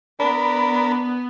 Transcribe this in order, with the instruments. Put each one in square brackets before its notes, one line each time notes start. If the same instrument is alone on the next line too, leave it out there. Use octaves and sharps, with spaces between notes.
[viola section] B3 [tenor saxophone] D4 [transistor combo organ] A#4 B5